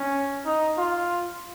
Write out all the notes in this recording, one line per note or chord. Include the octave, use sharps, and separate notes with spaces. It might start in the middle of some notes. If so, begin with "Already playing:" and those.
Already playing: C#4
D#4
F4